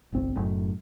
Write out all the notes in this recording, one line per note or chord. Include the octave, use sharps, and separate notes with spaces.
G1 C2 C4
F#1 F#2 A2